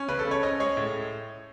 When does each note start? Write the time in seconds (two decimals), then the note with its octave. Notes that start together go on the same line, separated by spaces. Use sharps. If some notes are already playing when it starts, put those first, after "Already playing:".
Already playing: C#4
0.08 C#3 B4
0.19 A4
0.25 C#3
0.31 C#5
0.43 C#4 D#5
0.60 G#3 C#5
0.77 A2